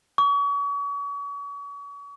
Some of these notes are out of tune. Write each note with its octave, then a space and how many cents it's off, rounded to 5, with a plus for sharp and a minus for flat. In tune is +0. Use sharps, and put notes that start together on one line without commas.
C#6 +40